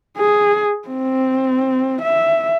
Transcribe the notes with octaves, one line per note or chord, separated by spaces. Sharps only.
G#4
C4
E5